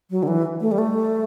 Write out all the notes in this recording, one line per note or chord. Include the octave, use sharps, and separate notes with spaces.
F#3
D3
E3
A3
G3
A3